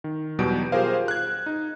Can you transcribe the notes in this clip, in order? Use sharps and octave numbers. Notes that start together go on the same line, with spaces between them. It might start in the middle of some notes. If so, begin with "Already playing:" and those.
D#3
E2 B2 F#3 G3 G6 D7
F4 G4 G#4 A#4 C5 F5
F#6 G#6
D#4